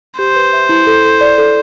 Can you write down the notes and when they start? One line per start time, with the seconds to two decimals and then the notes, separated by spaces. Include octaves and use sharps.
0.19 G4 C5
0.36 B4
0.53 E5
0.69 E4
0.87 A4
1.04 A4
1.21 D5
1.38 A4